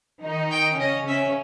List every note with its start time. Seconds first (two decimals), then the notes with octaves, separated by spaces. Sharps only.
0.23 D#3 D#4
0.51 G5
0.79 C#3 C#4 D#5
1.07 C#3 C#4 E5